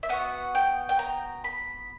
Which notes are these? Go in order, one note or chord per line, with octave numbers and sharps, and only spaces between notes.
E5
B3 F#4 F#5
G5
G5
A#5
B5